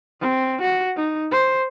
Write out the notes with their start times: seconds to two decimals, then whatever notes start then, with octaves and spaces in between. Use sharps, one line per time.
0.20 C4
0.61 F#4
0.96 D#4
1.31 C5